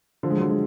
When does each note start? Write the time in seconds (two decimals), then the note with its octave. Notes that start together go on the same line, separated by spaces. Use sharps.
0.23 D3 F3
0.30 G#3
0.37 F#3
0.41 D3
0.50 G#3